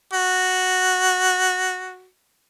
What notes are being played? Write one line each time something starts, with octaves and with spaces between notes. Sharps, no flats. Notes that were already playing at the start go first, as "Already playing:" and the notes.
F#4